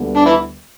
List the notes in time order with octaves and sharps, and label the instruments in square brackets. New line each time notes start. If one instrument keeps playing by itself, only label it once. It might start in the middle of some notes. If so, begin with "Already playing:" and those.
Already playing: [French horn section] D2 D3 G3 B3
[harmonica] D4
E3 E4